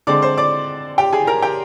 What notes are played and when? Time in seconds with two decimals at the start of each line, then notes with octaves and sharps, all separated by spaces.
0.07 D3 G#3 C4 D5 D6
0.22 C5 C6
0.37 D5 D6
0.98 G4 G5
1.13 G#4 G#5
1.27 A#4 A#5
1.42 G4 G5